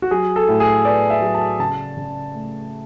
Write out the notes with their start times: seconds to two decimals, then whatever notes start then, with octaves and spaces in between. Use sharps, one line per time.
0.02 F#4
0.11 F#3 G#4
0.36 A4
0.48 A2
0.60 G#4
0.85 B3 D5
1.10 E5
1.22 F#3
1.35 A5
1.59 C#3 A5
1.97 C#3
2.34 A3